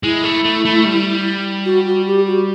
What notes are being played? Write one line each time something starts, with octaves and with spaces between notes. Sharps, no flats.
G#3 E4
A3
A3
A3
G3
F#4
F#4
G4
F#4